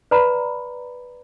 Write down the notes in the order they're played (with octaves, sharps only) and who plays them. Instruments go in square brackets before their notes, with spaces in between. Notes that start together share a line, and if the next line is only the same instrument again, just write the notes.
[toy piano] B4 D5 A#5 B5